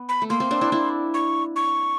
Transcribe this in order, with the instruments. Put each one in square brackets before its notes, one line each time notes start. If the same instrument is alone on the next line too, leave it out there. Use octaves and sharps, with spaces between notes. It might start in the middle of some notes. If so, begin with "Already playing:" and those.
Already playing: [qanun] B3
[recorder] B5
[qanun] A3
[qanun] A#3 [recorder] C6
[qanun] A#3 C4
C4 D4
D4 E4
D4 E4
[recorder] C#6
C#6